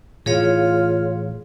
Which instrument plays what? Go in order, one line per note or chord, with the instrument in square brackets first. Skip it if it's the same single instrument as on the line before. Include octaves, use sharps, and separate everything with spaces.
[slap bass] A2 E3 [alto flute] F4 [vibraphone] G#4 C#5 F5